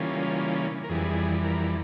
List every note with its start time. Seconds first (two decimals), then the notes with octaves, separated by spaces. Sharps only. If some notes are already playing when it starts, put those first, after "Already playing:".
Already playing: C#3 E3 G3 A#3 C#4 F4
0.84 A#4
0.89 F2 E3 G3 G#4
1.44 A#4